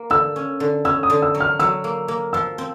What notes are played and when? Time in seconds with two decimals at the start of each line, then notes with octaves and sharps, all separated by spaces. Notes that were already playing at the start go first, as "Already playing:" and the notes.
Already playing: A#3
0.10 D3 E6
0.36 C#4
0.60 D3
0.85 C#4 E6
1.03 D#6
1.10 D3
1.22 E6
1.35 F#3
1.40 F6
1.60 F#3 E6
1.84 A#3
2.08 A#3
2.33 F3 E6
2.58 C4